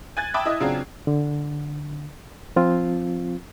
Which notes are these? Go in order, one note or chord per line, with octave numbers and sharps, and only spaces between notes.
G#5 F#6 G#6 A6
E5 G5 A5 B5 D6 D#6
E4 D#5 D#6
C#3 F#3 C4 D4 F4 G#4
D3
F3 C4 F4